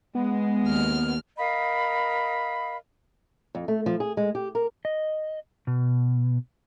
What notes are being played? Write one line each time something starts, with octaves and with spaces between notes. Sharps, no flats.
G#3 B3
D#2 F6
A#4 D#5 F5 B5
F2
A3
F3
G#4
G#3
G4
A#4
D#5
B2